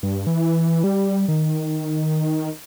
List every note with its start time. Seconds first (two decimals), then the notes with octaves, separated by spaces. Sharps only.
0.03 G2
0.27 E3
0.84 G3
1.28 D#3